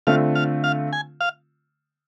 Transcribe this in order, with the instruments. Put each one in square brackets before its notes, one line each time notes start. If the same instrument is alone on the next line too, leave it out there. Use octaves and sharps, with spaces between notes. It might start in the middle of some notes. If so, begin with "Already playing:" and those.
[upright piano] D3 A3 C4 F4 [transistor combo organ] F5
[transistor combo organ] F5
F5
G#5
F5